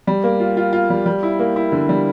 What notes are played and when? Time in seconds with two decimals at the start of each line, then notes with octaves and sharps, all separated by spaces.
0.07 G3
0.24 A#3
0.40 F4
0.57 F4
0.73 F4
0.90 G3
1.06 G3
1.23 E4
1.39 A#3
1.56 E4
1.72 D3
1.89 G3